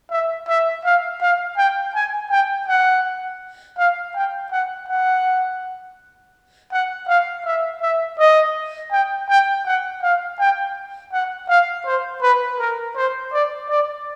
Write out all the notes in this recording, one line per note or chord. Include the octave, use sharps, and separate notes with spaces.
E5
E5
F5
F5
G5
G#5
G5
F#5
F5
G5
F#5
F#5
F#5
F5
E5
E5
D#5
G5
G5
F#5
F5
G5
F#5
F5
C5
B4
A#4
C5
D5
D5